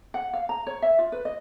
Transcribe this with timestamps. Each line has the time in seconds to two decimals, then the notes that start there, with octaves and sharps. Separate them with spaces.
0.14 F#5
0.33 F5
0.49 A#5
0.67 C#5
0.82 E5
0.99 F4
1.12 B4
1.25 D#5